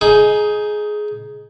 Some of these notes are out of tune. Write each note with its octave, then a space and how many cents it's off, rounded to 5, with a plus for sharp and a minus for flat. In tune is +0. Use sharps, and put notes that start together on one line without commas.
D#4 +0 G#4 +15